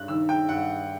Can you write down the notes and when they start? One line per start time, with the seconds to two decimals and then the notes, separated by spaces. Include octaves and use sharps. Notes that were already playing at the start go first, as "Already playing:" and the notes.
Already playing: G2 F#6
0.08 D#3 E6
0.29 G5
0.49 G2 F#5